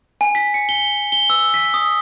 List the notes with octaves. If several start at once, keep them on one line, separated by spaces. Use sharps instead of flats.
G#5
B6
C#7
G7
G7
E6
B6
D#6